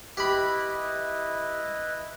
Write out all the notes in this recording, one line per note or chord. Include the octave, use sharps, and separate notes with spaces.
E4 G4 B4 D#5 B5